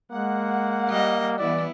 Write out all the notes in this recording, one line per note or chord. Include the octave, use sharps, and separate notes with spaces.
G#3 A#3 F#5
G3 D#5
E3 B3 E4 D5